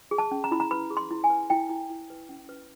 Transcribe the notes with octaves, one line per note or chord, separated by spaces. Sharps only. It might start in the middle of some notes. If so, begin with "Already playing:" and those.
G#4
A5
C#4
A#5
E4 B5
A#5
B4 B5
G#4
C6
E4
G#5
B4
E4 G5
E4
E4
B4
C#4
B4